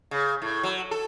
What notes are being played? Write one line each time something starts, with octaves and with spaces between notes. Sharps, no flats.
C#3
A2
F#3
A4